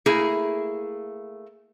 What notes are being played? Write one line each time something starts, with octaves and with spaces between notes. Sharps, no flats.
A3 A#3 E4 G#4